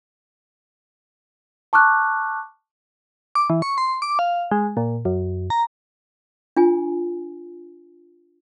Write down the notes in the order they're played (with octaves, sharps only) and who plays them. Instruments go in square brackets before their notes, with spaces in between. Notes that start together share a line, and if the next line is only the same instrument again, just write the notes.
[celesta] A5 C#6 D6 F6 F#6
[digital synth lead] D6
E3
C#6
C6
D6
F5
G#3
A#2
F#2
A#5
[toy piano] D4 F4 G#5